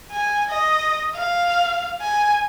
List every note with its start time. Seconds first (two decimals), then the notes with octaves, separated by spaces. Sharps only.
0.12 G#5
0.49 D#5
1.15 F5
2.01 G#5